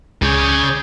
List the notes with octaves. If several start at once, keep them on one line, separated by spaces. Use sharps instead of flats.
C#2 C#3 G#4 C#5 D5 G6